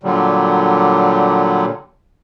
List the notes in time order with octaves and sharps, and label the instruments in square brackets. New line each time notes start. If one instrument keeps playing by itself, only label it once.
[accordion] A#2 D3 F#3 G3